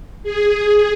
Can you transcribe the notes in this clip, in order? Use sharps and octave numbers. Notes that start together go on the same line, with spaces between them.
G#4